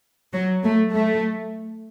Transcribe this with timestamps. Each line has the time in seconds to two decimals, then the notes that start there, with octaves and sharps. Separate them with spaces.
0.34 F#3
0.63 A3
0.92 A3